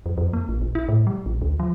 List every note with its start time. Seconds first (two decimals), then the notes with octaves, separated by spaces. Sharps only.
0.06 F2
0.18 F2
0.33 A#3
0.49 A#1
0.61 A#1
0.75 E4
0.88 A2
1.07 G3
1.26 A#1
1.42 D2
1.60 F3